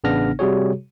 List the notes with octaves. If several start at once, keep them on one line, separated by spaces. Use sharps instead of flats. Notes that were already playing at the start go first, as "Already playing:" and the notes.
A1 C#3 B3 D4 F6 A#6
C3 G3 F#4 G#4 C#5